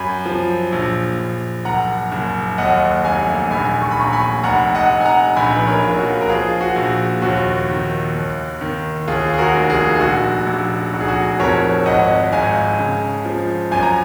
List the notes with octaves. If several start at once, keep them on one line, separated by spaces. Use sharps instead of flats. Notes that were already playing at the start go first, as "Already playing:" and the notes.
Already playing: F#2 G#5 B5
F3
A#1
A#1
F#1 F#5 A#5
F#1
D#2 D#5 F#5
F1 F5 G#5
A#1 G#5 B5
C#6
B5
A#1 A#5 C#6
G#5 B5
F1 F#5 A#5
D#5 F#5
F1
G#5
F#5 A#5
A#1 G#5 B5
B4
A#4 C#5
A#1 F4
F#4
A#4
F3 F4 G#4
F#4
A#1
D#2 F#4
D#3
D#2
D#3
D#2 F4 G#4
G#4
F#4 A#4
F1
F4 G#4
G#4
A#1 F#4
A#1
F1 F#4
G#4
F#4
F2 A#4 C#5
G#1 D#5 F#5
G#2 F5 G#5
C#3
F3
F#2 G#5
A#5